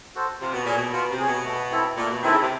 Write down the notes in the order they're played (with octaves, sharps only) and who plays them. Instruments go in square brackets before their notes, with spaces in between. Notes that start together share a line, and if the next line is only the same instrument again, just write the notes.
[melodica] F#4 A4 C5
[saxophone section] C3 [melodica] F4
[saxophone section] B2
[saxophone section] A#2 [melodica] G#4 C#5
[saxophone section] B2
[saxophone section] B2 [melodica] F4
[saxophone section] C3
[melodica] G#4 C#5
[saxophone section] B2
[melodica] A3
C4 E4 A4
[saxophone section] A#2 [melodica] A3
[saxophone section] B2
[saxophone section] D#3 [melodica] C4 E4 A4
[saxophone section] C#3
C3